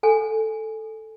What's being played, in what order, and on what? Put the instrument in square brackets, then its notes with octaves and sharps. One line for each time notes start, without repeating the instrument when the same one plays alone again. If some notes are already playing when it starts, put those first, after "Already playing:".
[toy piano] A4 G#5